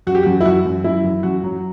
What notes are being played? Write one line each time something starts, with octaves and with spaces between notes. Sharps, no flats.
F#2 F#4
G4
F#2 F#4
E4
F#2 F#4
F#2
F#2 E4
F#2
F#2 F#4
F#3